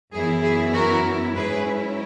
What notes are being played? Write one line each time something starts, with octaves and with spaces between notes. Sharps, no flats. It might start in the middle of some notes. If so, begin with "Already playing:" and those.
F#2 E3 B3 E4 G#4
G#4
F#4 A#4
G#2 F#3 C#4 E4 G#4 B4